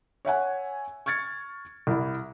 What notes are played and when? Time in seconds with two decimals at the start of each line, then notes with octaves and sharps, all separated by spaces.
0.25 C#5 E5 F#5 G#5
1.06 C#6 F6 G#6 A6 C#7
1.87 C2 E4